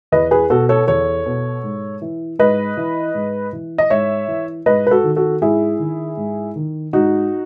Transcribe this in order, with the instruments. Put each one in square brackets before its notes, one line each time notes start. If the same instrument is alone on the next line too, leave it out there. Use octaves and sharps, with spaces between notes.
[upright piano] E2 B4 D#5
G#4 B4
B2 F#4 A4
A4 C#5
E2 A4 C#5
B2
G#2
E3
G#2 B4 D#5
E3
G#2
E3
D#5
G#2 C#5 E5
E3
G#2 B4 D#5
B4
F#4 A4
D#3
F#4 A4
G#2 E4 G#4
D#3
G#2
D#3
G#2 D#4 F#4